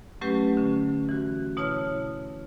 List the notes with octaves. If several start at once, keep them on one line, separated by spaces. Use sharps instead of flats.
F#3 A3 C#4 G4 B4
D3 C#4
E3 F#4
B2 E4 C#5 A5 F6